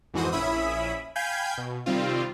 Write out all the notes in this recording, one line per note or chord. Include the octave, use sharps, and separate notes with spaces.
F2 G#2 E3 F#4 C5 D#6
A#1 C#4 E4 E5 B5 D#6
F5 G5 G#5 B5 G6 G#6
B2
C3 D#3 G3 C4 F4